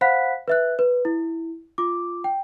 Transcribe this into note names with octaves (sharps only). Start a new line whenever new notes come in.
C5 F5 F#5 B5 F#6 B6
B4 E5 F#6
B4
E4
F4 D6
G5